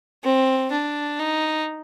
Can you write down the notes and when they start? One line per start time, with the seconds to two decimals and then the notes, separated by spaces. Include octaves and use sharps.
0.24 C4
0.71 D4
1.19 D#4